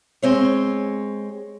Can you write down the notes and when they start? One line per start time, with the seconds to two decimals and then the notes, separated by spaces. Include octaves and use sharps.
0.22 G#3 C4 C#5